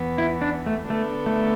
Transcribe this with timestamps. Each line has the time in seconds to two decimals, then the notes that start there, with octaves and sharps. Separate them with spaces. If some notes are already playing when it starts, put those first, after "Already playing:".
Already playing: E2 E3 B3
0.18 E4
0.42 D4
0.66 A3
0.90 D3 A3 B3 D4 A4
1.26 A3